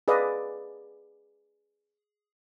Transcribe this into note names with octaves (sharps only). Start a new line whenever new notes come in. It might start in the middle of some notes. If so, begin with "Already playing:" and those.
G#4 B4 D5 D#5 F5